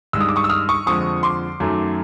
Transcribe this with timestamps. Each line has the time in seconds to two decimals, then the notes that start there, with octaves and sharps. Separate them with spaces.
0.13 G2 D#3 G#3 E6
0.20 D#6
0.29 D6
0.36 C#6 D#6
0.44 E6
0.49 D#6 F6
0.69 C#6 D#6
0.86 F2 D3 F3 G#3 C#6 D#6
1.23 C6 D6
1.60 F#2 D#3 F#3 A3